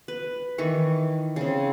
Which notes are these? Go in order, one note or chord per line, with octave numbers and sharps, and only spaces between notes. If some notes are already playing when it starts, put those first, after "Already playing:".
B4
D#3 E3 C#6
C#3 C4